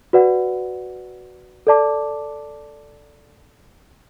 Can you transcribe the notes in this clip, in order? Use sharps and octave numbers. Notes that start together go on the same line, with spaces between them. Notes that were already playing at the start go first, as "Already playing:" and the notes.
F#4 B4 D5 F#5
A4 D5 A5 D6